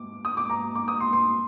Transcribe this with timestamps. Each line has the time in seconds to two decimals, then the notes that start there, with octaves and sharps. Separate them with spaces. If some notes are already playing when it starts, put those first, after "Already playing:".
Already playing: D6
0.25 D#6
0.37 D6
0.50 A#5
0.75 D6
0.88 D#6
1.00 C6
1.13 C6